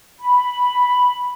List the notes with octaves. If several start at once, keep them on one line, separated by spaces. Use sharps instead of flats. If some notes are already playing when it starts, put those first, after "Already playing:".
B5